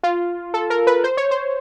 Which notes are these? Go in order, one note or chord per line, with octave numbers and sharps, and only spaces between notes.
F4
A4
A#4
B4
C5
C#5
C5